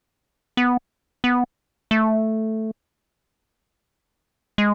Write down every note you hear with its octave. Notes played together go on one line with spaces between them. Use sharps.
B3
B3
A3
G#3